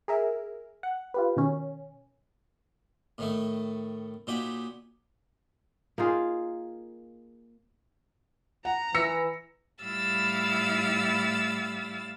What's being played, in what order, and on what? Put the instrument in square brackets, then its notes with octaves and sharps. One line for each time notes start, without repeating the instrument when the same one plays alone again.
[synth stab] G#4 A#4 E5
F#5
F4 G4 B4
B2 D#3 C#4
[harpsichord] A2 D#3 A3
A#2 F#3 D#4 G4 B5
[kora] A#3 D#4 F4 G#4
[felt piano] F#5 [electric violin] A#5
[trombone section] E3 [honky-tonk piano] E6 A#6 [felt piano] C#7
[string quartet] A2 G3 E4 F5 E6 A6